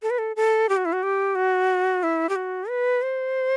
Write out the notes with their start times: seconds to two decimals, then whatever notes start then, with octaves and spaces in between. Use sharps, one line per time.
0.02 A4
0.10 B4
0.18 A4
0.36 A4
0.69 G4
0.77 F#4
0.85 E4
0.93 F#4
1.03 G4
1.35 F#4
2.03 E4
2.29 G4
2.36 F#4
2.69 B4
3.02 C5